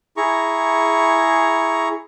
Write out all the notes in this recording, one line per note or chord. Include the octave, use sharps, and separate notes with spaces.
E4 G#4 A#5 C#6